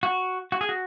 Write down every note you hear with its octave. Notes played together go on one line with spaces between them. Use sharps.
F#4
F#4
G#4
F#4